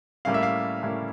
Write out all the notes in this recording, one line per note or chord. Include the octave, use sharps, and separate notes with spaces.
A2 G3 A#3 C#4 E4 F5
E5
F5
A2 G3 A#3 C#4 E4